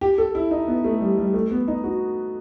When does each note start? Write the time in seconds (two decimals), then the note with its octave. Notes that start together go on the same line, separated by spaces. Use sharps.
0.01 G4
0.18 A4
0.35 E4
0.51 D#4
0.67 B3
0.84 A3
1.01 G3
1.18 G3
1.34 A3
1.51 B3
1.68 D#4
1.84 F#4